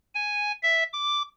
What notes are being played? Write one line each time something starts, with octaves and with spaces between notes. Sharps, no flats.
G#5
E5
D6